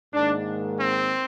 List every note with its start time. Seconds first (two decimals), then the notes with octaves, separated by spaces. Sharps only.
0.13 G#2 D#3 A#3 D4
0.77 C4